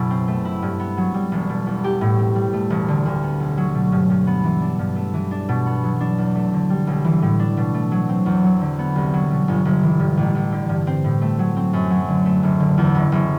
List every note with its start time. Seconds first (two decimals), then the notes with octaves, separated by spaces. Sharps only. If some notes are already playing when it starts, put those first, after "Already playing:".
Already playing: F#1 F#2 B2 E4
0.10 C4
0.28 A3
0.45 E4
0.62 G2
0.80 B3
0.97 F#3
1.14 G3
1.32 E1
1.50 B2
1.66 E2
1.84 G4
2.01 A2
2.19 C4
2.36 G3
2.53 A3
2.70 E1
2.88 D3
3.06 D2
3.23 B3
3.40 B1
3.57 F#3
3.75 B2
3.92 G2
4.10 G2
4.27 B3
4.44 E3
4.61 D4
4.79 G2
4.96 A3
5.14 E3
5.31 D4
5.49 B2
5.66 B3
5.84 F#3
6.00 D4
6.18 E2
6.35 A3
6.53 D3
6.70 G3
6.87 B1
7.05 E3
7.22 A2
7.39 D4
7.57 B2
7.74 A3
7.91 F#3
8.09 C4
8.26 E2
8.44 F#3
8.61 D3
8.79 B3
8.96 C2
9.13 F#3
9.31 B2
9.48 G1
9.65 G1
9.83 E3
10.00 G2
10.17 A1
10.35 A1
10.52 D3
10.69 G2
10.87 C4
11.04 A2
11.22 A3
11.39 F#3
11.56 C4
11.73 F#2
11.91 F#3
12.08 D3
12.25 A3
12.43 F#1
12.60 D3
12.78 E2
12.95 F#1
13.12 F#1